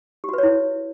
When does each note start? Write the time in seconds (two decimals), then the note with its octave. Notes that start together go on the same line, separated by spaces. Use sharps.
0.24 G4
0.29 F#4
0.33 B4
0.38 C#5
0.43 E4